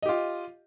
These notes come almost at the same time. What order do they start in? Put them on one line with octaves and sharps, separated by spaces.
D#5 G4 F4